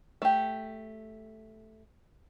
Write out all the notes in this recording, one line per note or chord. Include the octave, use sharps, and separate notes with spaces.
A3 G4